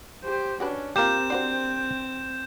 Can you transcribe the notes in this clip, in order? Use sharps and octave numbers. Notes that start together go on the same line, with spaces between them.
G4 C5
C#4 D4 F#4 G4 B4
A#3 C4 F4 G4 A#4 G6 E7
D4 F#4 C5